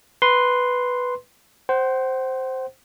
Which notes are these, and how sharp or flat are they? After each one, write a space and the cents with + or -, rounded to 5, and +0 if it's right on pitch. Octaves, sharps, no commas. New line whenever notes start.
B4 +0 C6 +0
C5 +0 F#5 +40